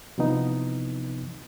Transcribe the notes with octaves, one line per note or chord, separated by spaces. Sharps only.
C3 E3 F3 B3 D#4